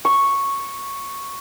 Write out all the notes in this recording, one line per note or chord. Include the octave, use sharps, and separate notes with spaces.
C#6